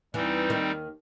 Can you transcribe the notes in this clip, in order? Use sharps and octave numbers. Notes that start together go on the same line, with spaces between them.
E2 E3 G3 C4 D#4
D#2 D#3